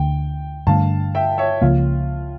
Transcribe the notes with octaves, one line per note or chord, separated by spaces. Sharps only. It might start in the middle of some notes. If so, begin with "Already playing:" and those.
Already playing: D2 D3 A3 G5
G2 D3 A3 F5 A5
E5 G5
C#5 E5
C#2 C#3 F3 A#3 F4